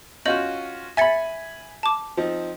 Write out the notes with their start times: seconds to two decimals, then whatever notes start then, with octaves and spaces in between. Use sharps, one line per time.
0.26 C#4 F4 F#4 D#5 G6 F#7
0.97 E5 G#5 B5 A6 C#7
1.83 A5 D6
2.17 F3 C4 D#4